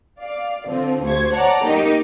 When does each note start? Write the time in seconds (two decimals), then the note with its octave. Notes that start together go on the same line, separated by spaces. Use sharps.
0.19 D5 F5
0.67 D3 F3 C4
1.03 D2 G4 C5 C#6 G#6
1.34 C#5 D5 F#5 A5 A#5
1.64 D#3 A#3 D#4 G4